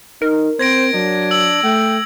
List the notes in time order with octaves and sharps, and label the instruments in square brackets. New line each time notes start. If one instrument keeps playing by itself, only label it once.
[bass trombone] D#4 [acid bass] A#4
[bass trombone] C4 [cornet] C5 [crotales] G#6 A#6 D7
[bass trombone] F#3 [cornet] D4
[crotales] E6 F#7
[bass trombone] A3 [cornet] G5